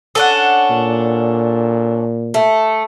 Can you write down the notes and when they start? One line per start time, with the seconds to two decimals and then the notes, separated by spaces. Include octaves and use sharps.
0.15 C#4 D4 A4 F#5
0.70 A#2
2.34 A3